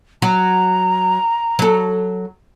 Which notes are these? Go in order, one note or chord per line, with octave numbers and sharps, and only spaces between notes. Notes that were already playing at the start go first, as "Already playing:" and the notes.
F#3 A#5
F#3 A4